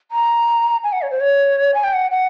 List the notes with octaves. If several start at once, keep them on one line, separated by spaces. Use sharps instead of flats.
A#5
G#5
F#5
C#5
C5
C#5
G#5
G5
F#5
F#5